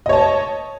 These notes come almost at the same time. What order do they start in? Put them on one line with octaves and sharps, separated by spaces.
D#5 C#5 A5